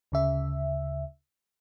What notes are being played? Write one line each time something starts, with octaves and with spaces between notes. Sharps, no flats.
D2 C#3 E5